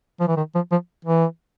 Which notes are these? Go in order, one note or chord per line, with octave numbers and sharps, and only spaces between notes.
F3
E3
D#3
F3
F3
E3